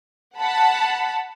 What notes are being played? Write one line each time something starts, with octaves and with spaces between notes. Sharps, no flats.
F#5 A5 B5